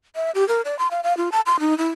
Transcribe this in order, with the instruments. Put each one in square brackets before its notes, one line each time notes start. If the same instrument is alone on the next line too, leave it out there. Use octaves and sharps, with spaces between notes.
[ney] E5
G4
A#4
D5
C6
F5
F5
F4
A5
C6
D#4
E4